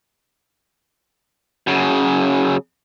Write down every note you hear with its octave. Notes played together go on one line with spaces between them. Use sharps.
F#2 C#3